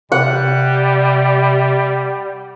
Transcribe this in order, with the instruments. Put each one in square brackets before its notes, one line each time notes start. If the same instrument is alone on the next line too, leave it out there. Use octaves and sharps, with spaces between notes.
[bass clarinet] C3 [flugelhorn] G3 [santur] F#5